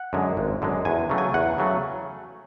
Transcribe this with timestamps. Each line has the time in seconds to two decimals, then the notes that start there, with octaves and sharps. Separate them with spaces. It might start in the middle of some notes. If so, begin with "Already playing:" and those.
Already playing: F#5
0.13 F#2 D3 G#3
0.37 G#1
0.62 F#2 D3 G#3
0.85 E2 G#5
1.10 C#3 F#3 A3
1.18 G#5
1.34 E2 F#5
1.58 C#3 F#3 A3